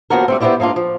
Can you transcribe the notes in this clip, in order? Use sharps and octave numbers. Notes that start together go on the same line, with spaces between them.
D#2 A#2 F3 B3 F#4 A#4
G3 A3 C4
B3 C4 D#4 E4 G4 D5
G#2 A#3 D4 F4
F3